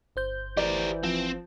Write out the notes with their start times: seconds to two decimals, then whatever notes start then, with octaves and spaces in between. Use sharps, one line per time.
0.16 G1 C5 G6
0.57 E3 G4 A#4 D5
1.03 F3 C4